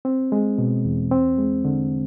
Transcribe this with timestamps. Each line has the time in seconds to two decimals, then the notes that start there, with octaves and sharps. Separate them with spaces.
0.05 C4
0.32 G#3
0.58 B2
0.85 E2
1.11 C4
1.39 G#3
1.65 D3